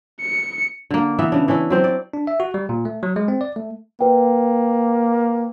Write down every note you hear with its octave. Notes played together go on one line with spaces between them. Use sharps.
C#7
D3 A#3
E3 B3 E5
C#3 D4
E3 C#4 D4 E4
F#3 C4 C5 D5
D5
D4
E5
F#4
G3
A#2
A3
F#3
G#3
C4
D5
A3
A#3 B4 G5